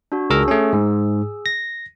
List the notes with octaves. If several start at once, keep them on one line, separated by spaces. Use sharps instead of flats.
D4 F#4
C#2 G#4 A#4 A#5 E6
A3 C#4
G#2
A#6